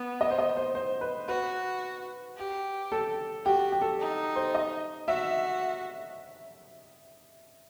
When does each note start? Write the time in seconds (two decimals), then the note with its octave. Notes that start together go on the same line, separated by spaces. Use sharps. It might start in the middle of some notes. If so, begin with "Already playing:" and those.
Already playing: B3
0.21 D#5
0.31 C5
0.38 D#5
0.57 C5
0.75 C5
1.01 B4
1.28 F#4 B4
2.37 G4
2.92 A4
3.45 F#4 G4
3.72 G4
3.81 A4
3.99 D#4
4.36 C5
4.55 D#5
5.08 F#4 E5